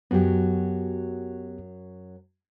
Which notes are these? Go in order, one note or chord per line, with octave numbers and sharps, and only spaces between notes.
F#2 F#3 B3 F#4 G4